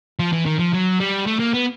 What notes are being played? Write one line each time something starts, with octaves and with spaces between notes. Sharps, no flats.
F3
E3
D#3
F3
F#3
G3
A3
A#3
B3